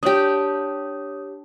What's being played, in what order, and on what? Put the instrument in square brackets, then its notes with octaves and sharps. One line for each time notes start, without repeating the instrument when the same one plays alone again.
[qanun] D4 G4 [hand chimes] C#5 D#6